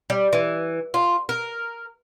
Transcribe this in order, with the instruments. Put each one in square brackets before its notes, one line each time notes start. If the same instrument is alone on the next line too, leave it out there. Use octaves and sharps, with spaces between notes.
[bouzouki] G3
E3
F4
A#4